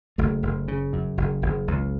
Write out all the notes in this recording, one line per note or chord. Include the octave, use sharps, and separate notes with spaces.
F#1 A3
F#1
C#3
F#2
F#1
F#1
C#2